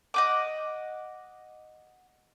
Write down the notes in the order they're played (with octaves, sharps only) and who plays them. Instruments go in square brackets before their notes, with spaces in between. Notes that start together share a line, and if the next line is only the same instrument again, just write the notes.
[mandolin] D#5 F#5 D6